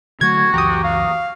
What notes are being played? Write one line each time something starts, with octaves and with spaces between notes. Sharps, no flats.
D3 F#3 A3 F#4 G#6
C#2 F#2 E3 G4 A#5 D#6
F5